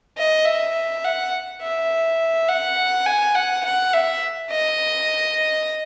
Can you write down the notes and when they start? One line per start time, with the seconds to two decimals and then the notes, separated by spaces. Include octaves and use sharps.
0.18 D#5
0.46 E5
1.04 F#5
1.61 E5
2.49 F#5
3.06 G#5
3.35 F#5
3.65 F#5
3.93 E5
4.51 D#5